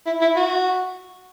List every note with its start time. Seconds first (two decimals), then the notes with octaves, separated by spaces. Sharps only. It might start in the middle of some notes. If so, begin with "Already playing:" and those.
0.06 E4
0.21 E4
0.36 F#4